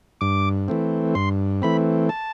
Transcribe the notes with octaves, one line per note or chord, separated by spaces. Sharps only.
G2 D6
E3 A3 C4
G2 C6
E3 A3 C4 B5
A5